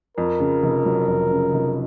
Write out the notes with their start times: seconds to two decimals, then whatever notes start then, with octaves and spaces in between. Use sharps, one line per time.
0.17 F2 A#4
0.40 C#3
0.63 F1
0.86 F#3
1.08 F2
1.31 C#3
1.54 F1